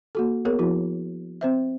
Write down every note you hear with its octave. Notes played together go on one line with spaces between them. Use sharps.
A#3 F#4 A4
B3 G#4 A#4 C#5
F3 E4 F#4
C4 C5 E5